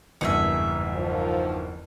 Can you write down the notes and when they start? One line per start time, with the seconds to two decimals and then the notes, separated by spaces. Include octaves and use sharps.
0.21 F#1 E2 G2 D#4 G#4 E5
0.94 D#3 F3